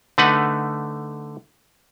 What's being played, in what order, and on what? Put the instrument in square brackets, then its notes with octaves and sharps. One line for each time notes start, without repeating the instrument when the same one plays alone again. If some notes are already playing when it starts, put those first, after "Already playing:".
[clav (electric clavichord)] D3 A3 D#4 B4 F#5